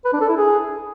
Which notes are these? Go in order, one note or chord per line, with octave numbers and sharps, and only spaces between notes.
B4
D4
A4
E4
G#4